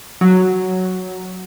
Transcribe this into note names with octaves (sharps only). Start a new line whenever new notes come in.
F#3